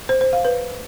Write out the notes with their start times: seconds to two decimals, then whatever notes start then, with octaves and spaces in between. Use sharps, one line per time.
0.09 C5
0.21 C5
0.33 F5
0.45 B4